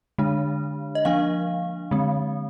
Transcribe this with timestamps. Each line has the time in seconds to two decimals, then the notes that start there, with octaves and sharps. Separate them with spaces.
0.18 D3 G#3 D4
0.95 D#5
1.05 F3 A#3 D4 F5
1.91 D3 G#3 C4